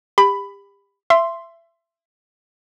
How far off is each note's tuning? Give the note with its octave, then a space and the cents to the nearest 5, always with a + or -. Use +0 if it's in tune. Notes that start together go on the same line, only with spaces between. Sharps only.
G4 +30 B5 +10
E5 +25 C6 +0